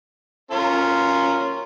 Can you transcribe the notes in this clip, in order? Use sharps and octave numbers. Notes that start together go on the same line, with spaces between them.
C#4 F4 A#4